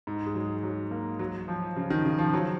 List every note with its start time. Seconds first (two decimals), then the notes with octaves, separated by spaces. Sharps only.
0.07 G#2
0.26 G#3
0.35 F#3
0.63 F#3
0.91 A#3
1.19 F#3
1.48 F3
1.76 C#3
1.90 D#3
2.05 C#3
2.19 F3
2.34 F#3